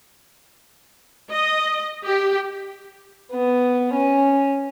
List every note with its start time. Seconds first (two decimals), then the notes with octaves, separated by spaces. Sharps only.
1.31 D#5
2.05 G4
3.32 B3
3.94 C#4